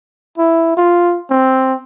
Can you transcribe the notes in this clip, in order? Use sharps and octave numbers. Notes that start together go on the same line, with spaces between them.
E4
F4
C4